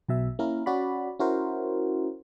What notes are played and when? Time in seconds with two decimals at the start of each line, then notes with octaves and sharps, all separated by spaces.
0.09 B1 B2 E5
0.39 A#3 C#4 E4 A#4
0.66 C#4 F#4 D5 B5
1.19 C#4 E4 F#4 A#4 C5